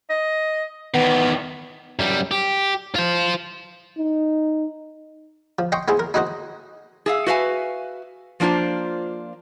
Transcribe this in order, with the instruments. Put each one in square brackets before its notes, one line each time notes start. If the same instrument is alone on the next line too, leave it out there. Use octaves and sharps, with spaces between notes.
[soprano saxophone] D#5
[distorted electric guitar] E2 D#3 [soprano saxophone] B3
[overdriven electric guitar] F#2 G3
G4
F4 C5
[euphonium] D#4
[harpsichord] F3
D#5 G5 C6 C#6
B3 E4 G#4 C5
A#4
D#4 E4 F#4 C5 D#5
[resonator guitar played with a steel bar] G#4 E5 F5
F#4 B4 E5 F5 G#5
F3 A#3 D4 F4 C5